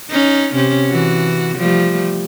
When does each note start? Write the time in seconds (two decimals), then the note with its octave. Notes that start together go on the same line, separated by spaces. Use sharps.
0.10 C#4 D#4
0.55 C3 C#4
0.91 E3 F#4
1.57 F3 G3 A3